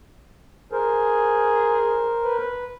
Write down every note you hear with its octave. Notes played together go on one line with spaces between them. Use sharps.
G#4 A#4 C5
B4